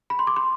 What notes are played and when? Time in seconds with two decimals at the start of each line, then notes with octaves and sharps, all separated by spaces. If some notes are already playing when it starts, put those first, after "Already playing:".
0.10 B5
0.19 C6
0.27 D6
0.36 C6